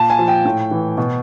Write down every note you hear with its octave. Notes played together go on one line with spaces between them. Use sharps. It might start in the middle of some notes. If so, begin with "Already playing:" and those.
Already playing: A#2 A5
G#5
F3
G5
A2
E3
B2